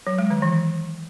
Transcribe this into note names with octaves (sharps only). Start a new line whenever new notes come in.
F#3
G#3
D#3
E3